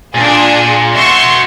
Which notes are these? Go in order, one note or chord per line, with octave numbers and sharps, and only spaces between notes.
A#2 D4 G#4
F#4 E5 C6 C#6